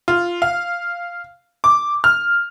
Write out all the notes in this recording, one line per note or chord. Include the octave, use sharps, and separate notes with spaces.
F4
F5
D6
F6